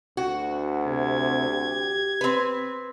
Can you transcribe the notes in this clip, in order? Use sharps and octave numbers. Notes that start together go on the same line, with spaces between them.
D2 F#4
C3 G#6
G4
C4 B4